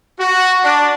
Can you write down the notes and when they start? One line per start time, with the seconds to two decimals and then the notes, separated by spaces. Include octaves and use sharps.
0.20 F#4
0.64 D4